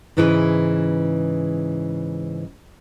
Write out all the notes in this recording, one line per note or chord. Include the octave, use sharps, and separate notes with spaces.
G#2 C#3 E3 E4 G#4 B4